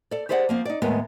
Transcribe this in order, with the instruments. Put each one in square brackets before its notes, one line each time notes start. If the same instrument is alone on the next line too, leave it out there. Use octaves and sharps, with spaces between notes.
[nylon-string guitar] A4 D5
G4 G#4 C5 D5 E5 F#5
F3 A#3 C4
D#4 D5
D#2 A2 G#3 B3 G#4 A#4